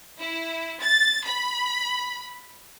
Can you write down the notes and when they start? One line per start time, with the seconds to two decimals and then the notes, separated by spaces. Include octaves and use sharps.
0.19 E4
0.81 A6
1.26 B5